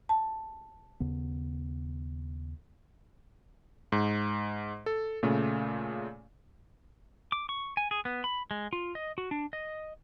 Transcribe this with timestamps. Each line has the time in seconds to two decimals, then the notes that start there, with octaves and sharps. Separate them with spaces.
0.09 A5
1.00 D#2 C#3 B3
3.92 G#2
4.86 A4
5.23 A#2 C#3 A3
7.32 D6
7.49 C#6
7.77 G#5
7.91 G#4
8.05 B3
8.24 B5
8.51 G#3
8.73 F4
8.95 D#5
9.18 F#4
9.31 D4
9.53 D#5